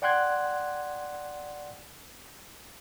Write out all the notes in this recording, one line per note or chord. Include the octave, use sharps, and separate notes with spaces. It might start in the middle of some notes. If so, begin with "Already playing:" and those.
D5 F#5 G5 C6 F#6 G#6